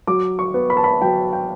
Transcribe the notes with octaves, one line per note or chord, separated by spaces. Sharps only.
F#3 D6
C#6
B3
B5
A5
B5
F#3 G5
G5